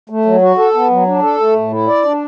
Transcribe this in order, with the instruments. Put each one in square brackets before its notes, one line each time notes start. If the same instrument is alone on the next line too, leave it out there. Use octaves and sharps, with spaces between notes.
[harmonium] A3
F#3
F#4
A4
B3
F#3
D4
A4
A3
A2
E4
D5
D4